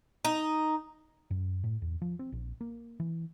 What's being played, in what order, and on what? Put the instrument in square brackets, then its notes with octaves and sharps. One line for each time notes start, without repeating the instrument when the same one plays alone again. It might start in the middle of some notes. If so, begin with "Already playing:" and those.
[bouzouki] D#4
[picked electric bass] F#2
A2
E2
F3
C4
A#1
A#3
E3